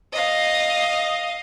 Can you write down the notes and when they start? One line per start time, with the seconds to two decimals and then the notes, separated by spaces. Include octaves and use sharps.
0.13 D#5 F5